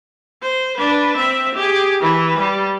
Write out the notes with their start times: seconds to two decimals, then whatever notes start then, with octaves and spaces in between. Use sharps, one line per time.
0.42 C5
0.77 D4 B4
1.17 C4 E5
1.55 G4 G#4
2.01 E3 B4
2.39 G3